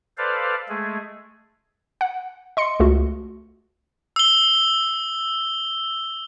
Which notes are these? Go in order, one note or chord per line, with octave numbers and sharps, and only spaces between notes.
A4 B4 C5 D5 F5
G#3 A3 G#4
F#5
D#5 C6 C#7
C#2 A3 F4 F#4
E6 G7